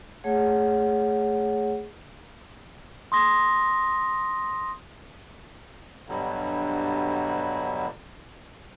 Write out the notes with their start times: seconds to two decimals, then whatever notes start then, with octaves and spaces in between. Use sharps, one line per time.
0.24 A3 G#4 C#5 F#5
3.12 C6 D#6 A#6
6.09 G2 B2 D3 F#3 G3